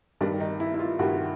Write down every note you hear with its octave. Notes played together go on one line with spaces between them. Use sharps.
G2 D#3 G3 D4
D#4
E4
E4
F4
G2 D#3 G3 F#4